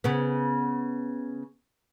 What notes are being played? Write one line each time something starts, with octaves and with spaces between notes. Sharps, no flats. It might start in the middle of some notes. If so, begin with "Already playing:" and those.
C#3 B3